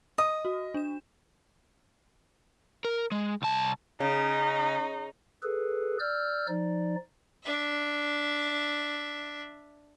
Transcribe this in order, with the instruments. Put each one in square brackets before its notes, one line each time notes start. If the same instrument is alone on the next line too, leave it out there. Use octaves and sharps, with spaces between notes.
[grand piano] D#5 [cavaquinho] D#6
[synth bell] F#4
D4 E7
[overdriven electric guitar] A#4
G#3
C2 A5
[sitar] C#3 [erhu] D#4
[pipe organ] G#4 A4 B4
D5 E6 F6 G6
F3 D#4 D5
[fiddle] D4 E5